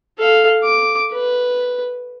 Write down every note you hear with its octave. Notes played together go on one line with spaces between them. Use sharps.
A4 F5
D6
B4